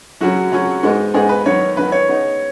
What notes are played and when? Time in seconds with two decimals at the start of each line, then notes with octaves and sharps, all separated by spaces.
0.21 F#2 C#3 F#3 C#4 F#4
0.52 F#2 C#3 F#3 C#4
0.83 G#2 G#3 B3 D#4
1.14 G#2 G#3 B3 D#4 G#4
1.29 B4
1.45 F#2 D#3 B3 C#5
1.76 F#2 D#3 B3 B4
1.92 C#5
2.08 C#3 B3 D#4